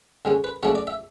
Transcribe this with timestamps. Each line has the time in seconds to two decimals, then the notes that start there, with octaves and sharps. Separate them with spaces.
0.25 D3 G#3 C#4
0.44 B4
0.63 C#3 F#3 A3 D4 C#5
0.75 D5
0.87 E5